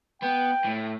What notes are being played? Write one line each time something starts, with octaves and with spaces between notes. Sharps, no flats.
B3 G5
A2